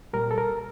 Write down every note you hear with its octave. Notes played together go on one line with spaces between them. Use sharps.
A#2 G3 A#4
A4
A#4